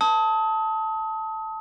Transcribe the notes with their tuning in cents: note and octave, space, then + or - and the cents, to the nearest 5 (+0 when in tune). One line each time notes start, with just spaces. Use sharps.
A5 +0 D#6 +35